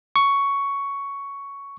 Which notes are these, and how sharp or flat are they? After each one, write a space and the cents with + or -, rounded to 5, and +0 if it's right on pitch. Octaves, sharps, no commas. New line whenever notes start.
C#6 +10